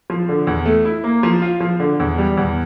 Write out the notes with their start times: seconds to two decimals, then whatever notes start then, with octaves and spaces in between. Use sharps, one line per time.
0.10 F3
0.29 D3
0.47 E2
0.66 A3
0.85 E4
1.04 A#3
1.23 F3
1.42 F4
1.60 F3
1.80 D3
2.00 E2
2.18 G3
2.37 E2